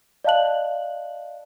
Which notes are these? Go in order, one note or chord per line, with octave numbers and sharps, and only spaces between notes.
D5 D#5 F5 A5 F#6 F#7